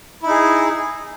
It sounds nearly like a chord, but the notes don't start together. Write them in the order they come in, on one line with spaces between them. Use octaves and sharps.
E4 D#4 G#4